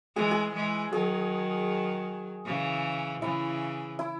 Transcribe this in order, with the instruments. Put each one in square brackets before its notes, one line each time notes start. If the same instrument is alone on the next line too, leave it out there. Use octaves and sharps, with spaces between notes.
[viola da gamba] E3 G#3 [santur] G#4
[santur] G#4
[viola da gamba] E3 G#3
[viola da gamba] D#3 F#3 [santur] G#4
[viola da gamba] C#3 E3
[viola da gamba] C#3 E3 [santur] E4
[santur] E4